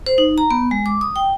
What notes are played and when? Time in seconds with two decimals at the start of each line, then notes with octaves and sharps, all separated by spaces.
0.06 C5
0.18 D#4
0.38 A#5
0.51 B3
0.71 G#3
0.86 D6
1.01 D#6
1.16 G5